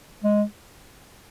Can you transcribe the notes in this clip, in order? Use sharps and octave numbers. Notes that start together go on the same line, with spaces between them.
G#3